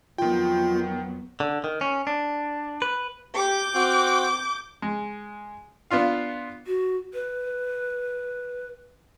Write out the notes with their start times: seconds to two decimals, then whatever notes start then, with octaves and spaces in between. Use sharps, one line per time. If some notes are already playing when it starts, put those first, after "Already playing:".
0.18 F2 D#3 F#3 B3 F4 G5
1.40 D3
1.64 D#3
1.81 C#4
2.07 D4
2.82 B4
3.35 G4 D6 G6
3.74 C4 F#4
4.82 G#3
5.91 B3 D4 F4 F5
6.67 F#4
7.14 B4